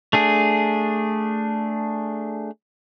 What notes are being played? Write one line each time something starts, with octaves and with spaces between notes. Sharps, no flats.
A3 D4 G#4